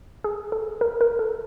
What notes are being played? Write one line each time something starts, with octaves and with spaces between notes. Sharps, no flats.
G#4
A4
A#4
A#4
A4